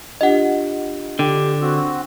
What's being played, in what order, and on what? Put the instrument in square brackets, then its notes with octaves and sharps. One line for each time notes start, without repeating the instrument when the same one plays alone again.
[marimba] D4 F4 G4 [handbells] D#5 F#5
[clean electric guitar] D3 [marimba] D4 [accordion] G4
[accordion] C4 F#4 [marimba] E6